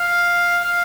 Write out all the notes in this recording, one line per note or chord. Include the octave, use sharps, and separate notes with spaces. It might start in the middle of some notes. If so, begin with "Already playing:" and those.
Already playing: F5
F5